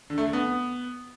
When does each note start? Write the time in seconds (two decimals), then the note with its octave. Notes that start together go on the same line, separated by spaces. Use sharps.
0.10 D3
0.18 A3
0.25 D3
0.33 B3